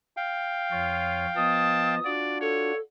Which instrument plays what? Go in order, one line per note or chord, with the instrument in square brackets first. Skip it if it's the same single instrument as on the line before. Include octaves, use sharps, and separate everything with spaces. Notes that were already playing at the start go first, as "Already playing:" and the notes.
[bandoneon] F5 G5
[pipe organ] F2 C#5 [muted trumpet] F4
[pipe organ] F3 B3 D#5 [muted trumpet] A5 [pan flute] D#6
[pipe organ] D4 F4 F#4 [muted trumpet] D5
[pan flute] A4 [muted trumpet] C#5